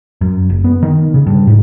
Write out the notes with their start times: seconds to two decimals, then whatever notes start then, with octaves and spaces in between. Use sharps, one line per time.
0.21 F#2
0.49 F#1
0.64 B3
0.83 D#3
1.14 C#3
1.27 G2
1.47 G#2